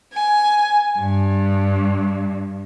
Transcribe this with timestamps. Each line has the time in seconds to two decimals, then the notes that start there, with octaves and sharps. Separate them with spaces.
0.13 G#5
0.98 G2